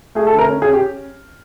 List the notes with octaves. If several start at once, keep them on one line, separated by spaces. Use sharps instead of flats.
A3 G#4
A4
D3
A#4
C#4
G#4
C#4
G4